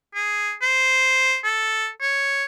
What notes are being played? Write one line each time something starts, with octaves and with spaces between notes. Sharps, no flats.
G#4
C5
A4
C#5